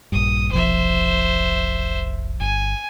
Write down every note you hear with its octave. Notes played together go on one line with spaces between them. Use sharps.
A#1 G2 D#6
F1 B1 F3 C5 E5
G1 G#5